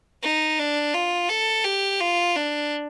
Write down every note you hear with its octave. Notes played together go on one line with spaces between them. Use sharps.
D#4
D4
F4
A4
G4
F4
D4